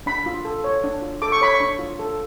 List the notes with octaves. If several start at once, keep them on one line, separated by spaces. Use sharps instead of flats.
D4 B5
F4
A4
C#5
D4
F4
A4 D6
C#6
C#5 B5
C#6
D4
F4
A4